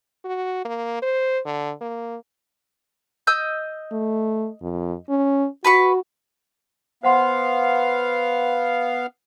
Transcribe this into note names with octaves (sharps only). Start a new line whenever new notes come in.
F#4
A#3
C5
D3
A#3
D#5 E6 G6
A3
F2
C#4
F#4 B4 B5 C#6
B3 C5 F5 F#5 C6